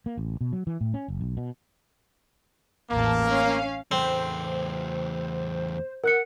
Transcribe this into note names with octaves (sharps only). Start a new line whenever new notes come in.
A#3
A1
B2
F#3
E3
A2
C#4
F#1
B1
B2
A1 E2 A#3 A5
C#4 F5
E2 A3 C4 C5
A#4 F#5 F#6 C#7